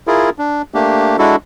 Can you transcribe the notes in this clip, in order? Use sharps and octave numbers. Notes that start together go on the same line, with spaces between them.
E4 F4 G#4 A#4
D4
A3 A#3 D4 G4
G#3 D4 E4 F#4 A4